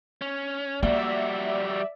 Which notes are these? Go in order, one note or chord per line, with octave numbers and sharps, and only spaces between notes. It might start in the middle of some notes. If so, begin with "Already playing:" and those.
C#4
G3 A#3 F#4 D5 E5